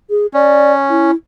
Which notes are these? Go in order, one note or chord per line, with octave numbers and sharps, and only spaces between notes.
G#4
C#4 D5
E4